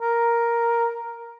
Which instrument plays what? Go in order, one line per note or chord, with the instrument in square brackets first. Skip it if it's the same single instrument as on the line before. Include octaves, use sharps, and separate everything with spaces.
[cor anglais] A#4